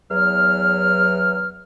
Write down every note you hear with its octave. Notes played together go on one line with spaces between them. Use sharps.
E2 F#3 F6